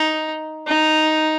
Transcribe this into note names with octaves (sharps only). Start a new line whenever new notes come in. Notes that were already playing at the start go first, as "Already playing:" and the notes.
Already playing: D#4
D#4